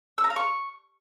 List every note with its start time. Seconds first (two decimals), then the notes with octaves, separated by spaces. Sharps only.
0.18 E6
0.24 A#5
0.30 F5
0.36 C#6